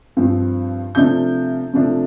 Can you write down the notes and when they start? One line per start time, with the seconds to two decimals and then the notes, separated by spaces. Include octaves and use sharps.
0.17 G2 F3 C4
0.95 C3 F3 A3 D4 G6
1.74 C3 F3 A3 D4